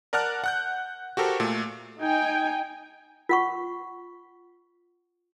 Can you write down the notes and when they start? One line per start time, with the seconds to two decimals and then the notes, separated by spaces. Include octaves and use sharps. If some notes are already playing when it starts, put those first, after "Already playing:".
0.13 A#4 D5 F#5 A5 F6 F#6
0.44 F#5 F#6 G6
1.17 F#4 G4 A4 A#4 C5
1.40 A#2 A3
2.00 D#4 G5 G#5
3.29 F4 F#5 C#6